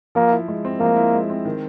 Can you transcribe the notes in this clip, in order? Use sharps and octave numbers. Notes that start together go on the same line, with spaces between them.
F3 A#3
E4
G#3
C4
F3 A#3
E4
G#3
C4
D#3